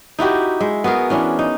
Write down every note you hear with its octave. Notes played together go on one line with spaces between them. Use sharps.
D#4 E4 F#4 G4
G#3 E5
B3 F#4 G#4 A#4
E3 C#4 D4 E4
D#4